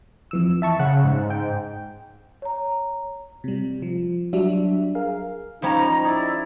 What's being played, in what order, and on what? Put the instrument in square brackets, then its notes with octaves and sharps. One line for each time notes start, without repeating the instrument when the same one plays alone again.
[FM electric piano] F2 E3 E6
E5 A5 C#6
[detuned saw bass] C#3 [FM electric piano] F#5
[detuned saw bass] G#2
[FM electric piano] G5
[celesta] C#5 A#5
[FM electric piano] C3 G3
F3
F#3 G3 D4 F#4 E5
G#4 A#4 F5
[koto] F3 G3 C#4 [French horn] D#4 [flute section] A#5
[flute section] E4 D5 [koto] G#4